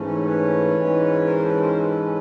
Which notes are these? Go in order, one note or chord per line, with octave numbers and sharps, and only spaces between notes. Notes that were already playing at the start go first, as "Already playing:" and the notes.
Already playing: G#2 E3 A3 C#4
B4 C#5
G#2 E3 G#3 C#4
A#4 C5
A4 B4
A#4 C5
A4 B4